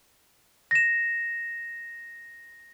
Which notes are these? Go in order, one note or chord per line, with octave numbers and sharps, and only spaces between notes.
A#6 E7